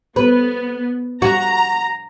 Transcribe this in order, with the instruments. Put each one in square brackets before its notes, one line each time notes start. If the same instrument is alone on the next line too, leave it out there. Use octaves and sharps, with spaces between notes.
[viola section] B3 [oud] B4
[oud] F#4 [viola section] A#5